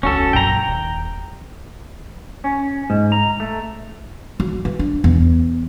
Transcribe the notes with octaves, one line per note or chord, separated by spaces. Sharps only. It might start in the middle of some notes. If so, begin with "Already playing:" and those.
E1 C#2 C#4 F#4 A4
A#1 F#2 A#2 G5 A#5
D#1
C#4
G#2
A#5
A3
F#3
E3
D4
E2